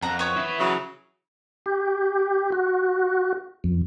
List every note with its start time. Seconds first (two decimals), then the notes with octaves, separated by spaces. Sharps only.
0.02 F2 F#5 A#5
0.19 B3 C#5
0.36 E4 B4 E5
0.59 C#3 E3 F#3
1.66 G4
2.52 F#4
3.64 F2